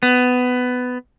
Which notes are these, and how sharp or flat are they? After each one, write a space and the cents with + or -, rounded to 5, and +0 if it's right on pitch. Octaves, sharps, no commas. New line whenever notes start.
B3 +15